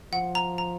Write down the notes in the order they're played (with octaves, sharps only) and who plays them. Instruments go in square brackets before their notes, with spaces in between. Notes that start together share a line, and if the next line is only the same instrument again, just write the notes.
[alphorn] F3 [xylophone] F#5
[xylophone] A#5
A#5